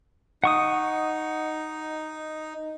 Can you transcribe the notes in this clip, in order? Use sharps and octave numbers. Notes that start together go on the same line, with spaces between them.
D#4 F#5 C#6 D#6